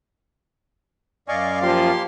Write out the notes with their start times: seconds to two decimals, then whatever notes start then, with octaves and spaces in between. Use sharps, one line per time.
1.28 F#2 D5 D#5 F5 G#5 C#6
1.62 F3 A#3 G4 C6